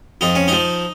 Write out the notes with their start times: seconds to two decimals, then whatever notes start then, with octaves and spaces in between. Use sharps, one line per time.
0.21 F2 D#4
0.35 C#4
0.48 F3 D#4